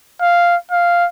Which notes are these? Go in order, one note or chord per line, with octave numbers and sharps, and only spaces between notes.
F5
F5